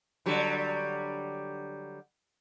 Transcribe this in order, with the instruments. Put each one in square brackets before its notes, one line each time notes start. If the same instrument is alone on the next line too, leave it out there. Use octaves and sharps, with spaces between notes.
[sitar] D3 F#3 G3